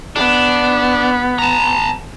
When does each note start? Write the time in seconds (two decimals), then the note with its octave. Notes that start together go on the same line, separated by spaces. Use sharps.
0.16 B3 D4
1.39 A5 A#5